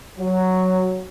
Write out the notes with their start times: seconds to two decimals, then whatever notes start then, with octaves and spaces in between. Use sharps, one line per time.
0.18 F#3